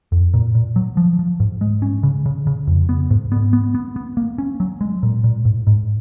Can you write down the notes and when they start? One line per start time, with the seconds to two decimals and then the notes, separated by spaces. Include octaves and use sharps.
0.12 F2
0.34 A#2
0.55 A#2
0.76 F#3
0.97 F3
1.19 F3
1.40 G#2
1.61 G#3
1.82 C#4
2.03 C#3
2.26 C#3
2.47 C#3
2.67 F2
2.89 B3
3.11 G#2
3.32 B3
3.53 B3
3.75 B3
3.96 B3
4.17 A#3
4.38 C#4
4.60 F#3
4.81 G#3
5.03 A#2
5.24 A#2
5.45 G#2
5.67 G#2